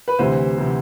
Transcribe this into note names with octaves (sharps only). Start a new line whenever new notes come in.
B4
D2 C3 E3 C5
C3 E3